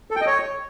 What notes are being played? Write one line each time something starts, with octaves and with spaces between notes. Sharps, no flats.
A4
G5
D#5
C#5